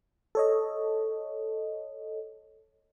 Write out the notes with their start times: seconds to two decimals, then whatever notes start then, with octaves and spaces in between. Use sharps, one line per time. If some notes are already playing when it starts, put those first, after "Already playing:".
0.35 A4 C#5 D#5